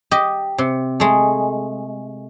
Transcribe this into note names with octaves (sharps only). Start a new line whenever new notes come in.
G4 D#5
C3
G#3 A3